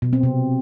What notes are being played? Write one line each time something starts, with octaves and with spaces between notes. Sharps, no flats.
B2
C4
C3